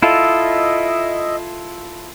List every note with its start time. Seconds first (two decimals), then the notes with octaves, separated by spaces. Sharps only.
0.02 E4 F4 A4 D#5 E5